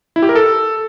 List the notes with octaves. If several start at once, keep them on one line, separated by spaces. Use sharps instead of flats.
E4
G4
A#4
A4